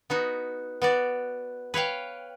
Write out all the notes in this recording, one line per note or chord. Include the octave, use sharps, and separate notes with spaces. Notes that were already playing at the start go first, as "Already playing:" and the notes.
B3 D#4 F#4
B3 F#4 D5
B4 C#5 F5 G5